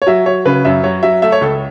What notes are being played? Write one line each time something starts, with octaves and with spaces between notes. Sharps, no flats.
C#5
F#3 E5
F#3 C#5
C#3 B4
F#2 E5
F#3 C#5
F#3 E5
A3 E5
C#5
C#2 A4